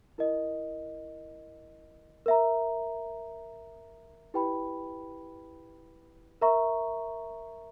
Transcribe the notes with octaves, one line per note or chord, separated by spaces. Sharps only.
E4 A#4 D#5
A#4 E5 A#5
E4 G4 B4 G5 B5
A#4 E5 A#5 C#6